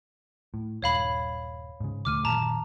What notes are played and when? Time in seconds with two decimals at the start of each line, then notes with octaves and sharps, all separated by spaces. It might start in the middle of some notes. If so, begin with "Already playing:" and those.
0.54 A2
0.82 D#1 G2 C#5 F5 B5
1.80 G#2 C#3
2.05 D#1 D3 A3 D6 F6 D#7
2.25 F#2 A#2 D#3 A5 A#5